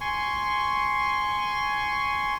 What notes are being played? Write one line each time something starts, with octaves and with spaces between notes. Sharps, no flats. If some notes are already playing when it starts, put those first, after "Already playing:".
G#5 C6 C#6